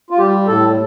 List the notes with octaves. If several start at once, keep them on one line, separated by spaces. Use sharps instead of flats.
F4
G3 G4
A2 A4